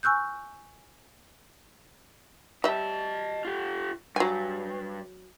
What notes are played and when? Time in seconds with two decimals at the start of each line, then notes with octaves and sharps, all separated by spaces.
0.03 G#5 C#6 E6 F#6 G6
2.64 G3 D#5 E5 A5
3.45 F4 G4
4.16 G2 F#3 G#5